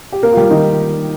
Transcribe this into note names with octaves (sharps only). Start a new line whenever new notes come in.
G4
A#3 A#4
F4
G3 G4
D#3 D#4